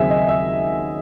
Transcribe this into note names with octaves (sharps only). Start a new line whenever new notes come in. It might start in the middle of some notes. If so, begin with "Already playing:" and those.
Already playing: D#2 C#3 F#3 C4 G#4 E5 G#5
D#5
E5